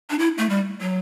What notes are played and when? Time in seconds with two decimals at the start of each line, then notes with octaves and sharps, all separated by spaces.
0.10 D4
0.19 E4
0.38 A3
0.49 G3
0.81 F#3